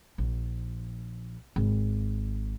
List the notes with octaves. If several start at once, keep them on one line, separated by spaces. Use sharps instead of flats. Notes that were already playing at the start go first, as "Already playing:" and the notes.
A#1
G#1